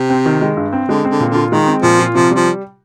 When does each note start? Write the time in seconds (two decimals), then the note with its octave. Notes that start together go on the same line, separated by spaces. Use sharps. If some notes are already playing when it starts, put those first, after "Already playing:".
Already playing: C3
0.10 C4
0.26 D#3
0.41 G#3
0.57 G2
0.73 C4
0.89 D3 G#3
1.05 C4
1.10 D3
1.20 A#2
1.30 D3
1.35 F4
1.51 D#3 G#3
1.67 C4
1.82 A#2 F3
1.99 F4
2.15 C3 F3
2.31 F3 G3